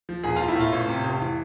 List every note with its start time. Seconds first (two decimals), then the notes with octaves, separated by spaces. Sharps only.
0.09 F3
0.23 E1 G#4
0.36 E1 F4
0.48 E4
0.55 A2 F4
0.73 A1
0.88 C3
1.04 F1
1.21 E3